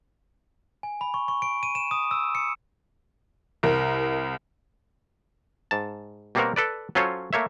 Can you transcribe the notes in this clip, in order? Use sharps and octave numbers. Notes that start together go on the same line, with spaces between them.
G#5
B5
C#6
C#6
D7
D#7
E7
D#6
E6
C#7
C2 A#4
G#2 A5
B2 G3 A#3 C4 F#4 A#4
A4 B4 D5
F#3 C#4 F4 A4 C5 C#5
A3 A#3 C#5 E5